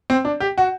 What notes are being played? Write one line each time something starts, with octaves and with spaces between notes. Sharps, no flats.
C4
D4
G4
F#4